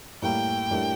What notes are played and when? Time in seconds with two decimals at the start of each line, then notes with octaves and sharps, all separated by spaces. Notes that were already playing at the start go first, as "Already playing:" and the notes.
0.22 A2 G3 A#3 G5
0.71 A2 G3 D4 G4 A#4